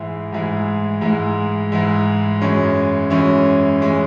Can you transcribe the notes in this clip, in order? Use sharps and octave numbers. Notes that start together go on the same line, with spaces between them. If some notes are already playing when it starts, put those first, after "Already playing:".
Already playing: G#2 E3 G#3 E4
G#2 E3 G#3 E4
G#2 E3 G#3 E4
G#2 E3 G#3 E4
F#2 E3 G#3 C#4
F#2 E3 G#3 C#4
E3 G#3 C#4